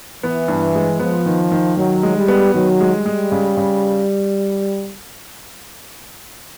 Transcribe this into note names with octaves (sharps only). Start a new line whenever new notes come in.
E3 B3
G2
G#3
F3 B3
D#3
D#3
D#3 F#3
G#3
G3
B3
D#3 F#3
G#3
G3
G#3
C#3
C#3